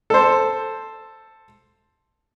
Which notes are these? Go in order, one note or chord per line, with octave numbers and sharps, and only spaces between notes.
A4 C5